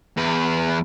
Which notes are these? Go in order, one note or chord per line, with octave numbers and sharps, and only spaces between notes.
E2 B4